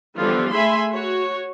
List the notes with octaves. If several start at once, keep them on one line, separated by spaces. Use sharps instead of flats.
D3 E3 F3 G3 B3 F4
A3 G#4 E5 G#5 B5 C6
F#4 C#5